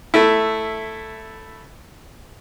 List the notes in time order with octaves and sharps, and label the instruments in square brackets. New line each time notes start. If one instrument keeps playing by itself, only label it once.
[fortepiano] A3 E4